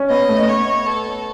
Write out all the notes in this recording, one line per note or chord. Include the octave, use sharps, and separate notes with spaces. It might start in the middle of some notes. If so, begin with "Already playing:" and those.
Already playing: C#4
B3 D#5
A3
B3 C#5
A4